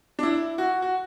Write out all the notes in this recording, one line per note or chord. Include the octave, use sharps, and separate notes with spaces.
D4
E4
F#4
F#4